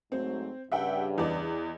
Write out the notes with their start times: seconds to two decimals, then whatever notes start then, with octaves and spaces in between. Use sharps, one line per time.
0.12 G#2 F#3 A3 C4
0.72 G2 C#3 E5 F#5 G5
1.18 E2 D5 D#5